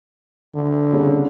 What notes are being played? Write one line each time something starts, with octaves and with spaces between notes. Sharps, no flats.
D3
C2 C#3